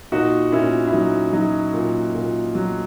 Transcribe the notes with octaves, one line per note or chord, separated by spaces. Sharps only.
A#2 D#4 F#4
A#2 C#4 E4
E4
F#3 D#4
F#3 D#4
A#2
A#2
F#3